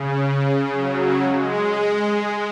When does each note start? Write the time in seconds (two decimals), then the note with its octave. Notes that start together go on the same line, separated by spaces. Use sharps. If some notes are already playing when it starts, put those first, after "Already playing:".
Already playing: C#3
0.71 F#3
1.23 G#3